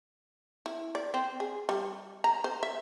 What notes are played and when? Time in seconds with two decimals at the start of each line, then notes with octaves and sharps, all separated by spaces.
0.66 E4
0.95 D5
1.14 C4
1.40 G#4
1.69 G3
2.24 A#5
2.44 C5
2.63 E5